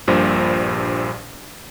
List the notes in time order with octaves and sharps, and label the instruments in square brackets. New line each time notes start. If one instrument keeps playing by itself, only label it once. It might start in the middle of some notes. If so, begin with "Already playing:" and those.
[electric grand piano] A#1 G2 A#2 C5